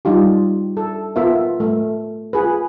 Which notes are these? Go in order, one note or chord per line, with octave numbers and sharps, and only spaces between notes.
G3 D#4 F4 G4
A4
B3 F4 A#4 E5
A3
F4 G#4 B4